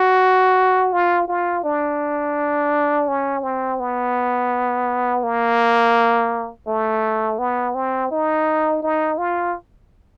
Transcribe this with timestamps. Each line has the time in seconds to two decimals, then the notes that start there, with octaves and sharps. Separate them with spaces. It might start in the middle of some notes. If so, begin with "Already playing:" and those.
Already playing: F#4
0.93 F4
1.28 F4
1.64 D4
3.08 C#4
3.43 C4
3.80 B3
5.23 A#3
6.67 A3
7.39 B3
7.75 C4
8.11 D#4
8.82 D#4
9.18 F4